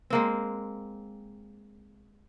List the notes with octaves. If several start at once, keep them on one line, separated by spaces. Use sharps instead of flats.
G#3 A#3 C4